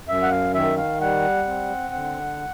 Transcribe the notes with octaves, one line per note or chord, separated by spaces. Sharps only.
F#2 E5
F#5
F5
D#3 E5
F5
G3 F#5
C4
D3